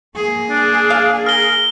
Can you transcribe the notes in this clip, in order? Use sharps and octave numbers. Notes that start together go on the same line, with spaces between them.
A#3 G#4
D4
F5
A#4 F6 G7